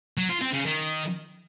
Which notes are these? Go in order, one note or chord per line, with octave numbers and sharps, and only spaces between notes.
F#3
F4
C4
C#3
D#3